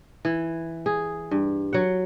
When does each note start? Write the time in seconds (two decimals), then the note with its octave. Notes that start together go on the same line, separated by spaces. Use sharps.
0.25 E3
0.86 G#4
1.31 G2
1.73 F#3 F#5